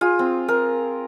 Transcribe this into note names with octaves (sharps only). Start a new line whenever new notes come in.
F4 G#4
C4
A#4